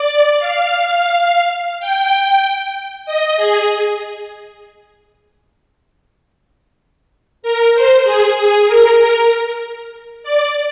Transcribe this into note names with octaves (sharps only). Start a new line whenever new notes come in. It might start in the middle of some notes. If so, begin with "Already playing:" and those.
Already playing: D5
F5
G5
D#5
G#4
A#4
C5
G#4
G#4
A#4
A#4
D5